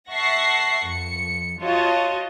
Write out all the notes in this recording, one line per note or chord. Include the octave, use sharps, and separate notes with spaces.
E5 F#5 A5 C#6 A#6 C7
F2 C#7
F4 F#4 C#5 D#5 A5